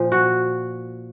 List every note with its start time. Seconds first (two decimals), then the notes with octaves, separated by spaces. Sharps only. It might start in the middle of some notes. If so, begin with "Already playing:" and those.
Already playing: A#2 F3
0.12 F#4